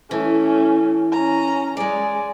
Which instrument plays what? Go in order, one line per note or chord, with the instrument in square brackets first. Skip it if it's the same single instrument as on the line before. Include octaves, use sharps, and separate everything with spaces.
[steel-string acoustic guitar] E3 [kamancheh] A3 C#4
[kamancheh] C#4 A#5
[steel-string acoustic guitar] G#3 D5 [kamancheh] G#4